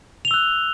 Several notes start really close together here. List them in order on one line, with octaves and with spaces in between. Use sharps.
F7 G7 E6 F#6